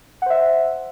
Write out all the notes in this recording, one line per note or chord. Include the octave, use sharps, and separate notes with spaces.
C5 E5 F#5